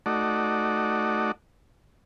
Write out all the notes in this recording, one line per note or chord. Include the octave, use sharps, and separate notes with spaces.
A3 D#4 F#4 D5